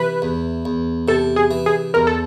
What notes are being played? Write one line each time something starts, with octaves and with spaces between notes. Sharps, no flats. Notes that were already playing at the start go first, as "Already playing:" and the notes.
Already playing: C3 E3 B4
E2
E2
C3 A4
G#4
E3
G#4
E2 A#4
A4